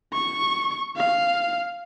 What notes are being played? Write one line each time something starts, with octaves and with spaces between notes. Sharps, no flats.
C#6
F5